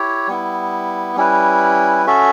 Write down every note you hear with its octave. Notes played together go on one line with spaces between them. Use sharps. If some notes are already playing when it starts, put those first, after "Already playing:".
Already playing: E4 G4 C#5
G3 B3 E4
G3 C#4 E4 B4
C#4 F#4 A4 E5